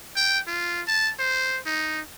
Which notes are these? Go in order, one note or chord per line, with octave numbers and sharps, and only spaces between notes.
G5
F4
A5
C5
D#4